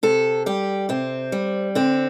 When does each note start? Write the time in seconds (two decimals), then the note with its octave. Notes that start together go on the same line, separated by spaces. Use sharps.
0.03 C3 A4
0.46 G3 G4
0.89 C3 C4
1.32 G3
1.75 D3 C4